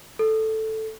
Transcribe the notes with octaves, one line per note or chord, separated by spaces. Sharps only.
A4